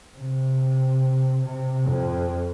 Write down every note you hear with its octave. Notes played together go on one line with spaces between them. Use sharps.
C3
C3
F2